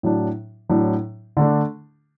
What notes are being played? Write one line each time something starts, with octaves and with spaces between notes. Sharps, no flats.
A2 F#3 D4
A2 F#3 D4
D3 A3 D4